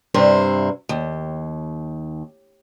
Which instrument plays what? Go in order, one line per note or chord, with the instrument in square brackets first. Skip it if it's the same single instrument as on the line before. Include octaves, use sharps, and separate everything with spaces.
[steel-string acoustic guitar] G2 C3 E4 C5
D#2